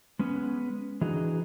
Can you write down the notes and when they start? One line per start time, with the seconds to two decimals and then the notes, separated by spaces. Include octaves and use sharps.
0.19 G#3 B3 C#4
1.01 E3 D4 D#4 F#4 G#4